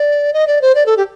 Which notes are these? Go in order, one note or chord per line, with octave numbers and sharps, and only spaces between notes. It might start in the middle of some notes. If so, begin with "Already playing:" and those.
Already playing: D5
D#5
D5
C5
D5
A4
G4